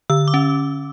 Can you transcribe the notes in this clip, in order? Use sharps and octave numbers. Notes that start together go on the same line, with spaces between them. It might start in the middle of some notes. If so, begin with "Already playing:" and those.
D3 E6
D6
C#4